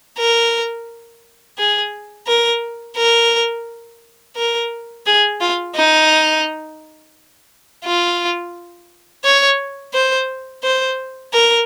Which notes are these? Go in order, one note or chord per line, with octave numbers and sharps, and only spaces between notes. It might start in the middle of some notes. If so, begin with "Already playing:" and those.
A#4
G#4
A#4
A#4
A#4
G#4
F4
D#4
F4
C#5
C5
C5
A#4